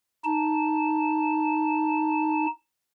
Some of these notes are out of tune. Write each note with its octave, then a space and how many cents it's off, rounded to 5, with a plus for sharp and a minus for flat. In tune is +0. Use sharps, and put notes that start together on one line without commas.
D#4 +0 A5 -5